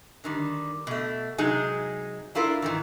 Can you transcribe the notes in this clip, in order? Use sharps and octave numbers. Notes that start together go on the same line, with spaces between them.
D3 D#3 G3
B2 A3
C3 F#3 G#3 D#4 G#4
D4 E4 F4 A4 A#4
G#2 D#3 E3